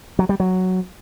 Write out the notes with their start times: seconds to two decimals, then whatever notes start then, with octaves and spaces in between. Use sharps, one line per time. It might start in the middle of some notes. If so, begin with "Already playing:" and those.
0.19 F#3
0.29 G3
0.40 F#3